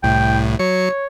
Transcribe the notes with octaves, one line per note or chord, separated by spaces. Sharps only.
C2 A2 G5
F#3 C#5 C#7